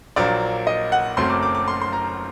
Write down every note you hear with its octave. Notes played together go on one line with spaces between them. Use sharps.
A#1 A#2 F#3 A#3 D5
D#5
F#5
F#1 F#2 F#3 A3 C4 C6
D6
D6
D6
C6
C6
A#5